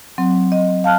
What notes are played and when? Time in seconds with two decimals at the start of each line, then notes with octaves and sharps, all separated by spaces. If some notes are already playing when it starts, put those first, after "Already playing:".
0.18 F#3 C4
0.52 D#5
0.84 F5 A5 F6 F#6